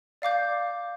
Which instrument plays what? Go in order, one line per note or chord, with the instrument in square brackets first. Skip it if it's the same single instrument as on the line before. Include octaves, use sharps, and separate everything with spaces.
[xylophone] D5 F5 D6 G6